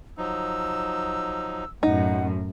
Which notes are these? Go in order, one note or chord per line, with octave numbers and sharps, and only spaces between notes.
F3 F#3 D#4 E6
F#2 A2 D#4 F#5